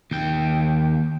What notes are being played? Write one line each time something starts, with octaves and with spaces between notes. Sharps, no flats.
D#2 G5